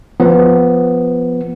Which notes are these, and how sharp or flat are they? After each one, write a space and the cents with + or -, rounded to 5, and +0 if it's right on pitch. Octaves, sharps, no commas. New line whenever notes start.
F3 +0 B3 +0